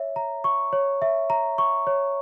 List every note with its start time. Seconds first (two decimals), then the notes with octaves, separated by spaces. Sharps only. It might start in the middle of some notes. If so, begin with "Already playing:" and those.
Already playing: C#5 E5
0.16 A#5
0.44 C#6
0.73 C#5
1.02 E5
1.30 A#5
1.58 C#6
1.87 C#5